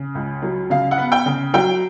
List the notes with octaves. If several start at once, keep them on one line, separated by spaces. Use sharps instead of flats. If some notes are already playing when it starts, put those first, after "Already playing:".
Already playing: C#3
C#2
F#3
C#3 F5
F#5
B3
G5
C#3
F#3 G5